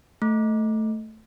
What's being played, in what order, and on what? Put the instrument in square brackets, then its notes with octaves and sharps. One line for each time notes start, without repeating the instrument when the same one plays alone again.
[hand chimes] A3